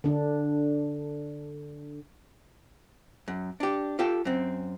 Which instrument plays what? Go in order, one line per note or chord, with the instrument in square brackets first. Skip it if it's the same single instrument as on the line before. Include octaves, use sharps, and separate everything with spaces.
[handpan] D3 D4
[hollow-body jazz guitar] F#2
D4 G4
F4 G4 A4 G5
F#2 C4